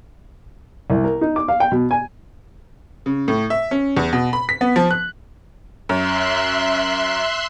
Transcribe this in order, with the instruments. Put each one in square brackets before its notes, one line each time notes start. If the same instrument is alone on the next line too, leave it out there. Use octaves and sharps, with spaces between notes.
[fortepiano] C2
A#4
D#4
D6
F5
G5
B2
G#5
[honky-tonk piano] C#3
A2
E5
C#4
E2
B2
B5
B6
B3
F3
F#6
[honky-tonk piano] F#2 [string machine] E5 C6 F#6